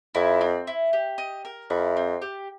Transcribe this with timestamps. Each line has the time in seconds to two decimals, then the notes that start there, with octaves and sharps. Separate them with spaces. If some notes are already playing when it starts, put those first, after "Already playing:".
0.15 F2 E4
0.41 C4
0.67 E4
0.93 G4
1.18 D#5
1.45 A#4
1.70 F2 E4
1.97 C4
2.22 G4